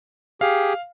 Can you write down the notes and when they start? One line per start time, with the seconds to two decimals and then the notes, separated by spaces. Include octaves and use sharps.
0.41 G4 G#4 F5